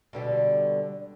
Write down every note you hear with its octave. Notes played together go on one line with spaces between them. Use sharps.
B2 D3 G3